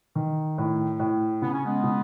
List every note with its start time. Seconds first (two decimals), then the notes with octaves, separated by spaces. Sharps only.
0.15 D#3
0.58 A2
1.00 A2
1.41 C#3 B3
1.53 C#4
1.65 G#3 B3
1.83 C#3